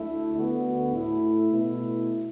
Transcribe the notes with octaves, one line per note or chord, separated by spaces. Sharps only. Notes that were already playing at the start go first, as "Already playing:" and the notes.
Already playing: D2 D3 A3 E4
D2 D3 B3 F#4
A2 A3 E4
B2 A3 E4